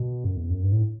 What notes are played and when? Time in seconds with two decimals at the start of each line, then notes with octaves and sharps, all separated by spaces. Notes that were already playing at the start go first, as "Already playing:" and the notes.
Already playing: B2
0.24 F#2
0.37 E2
0.50 F#2
0.63 G2
0.72 A2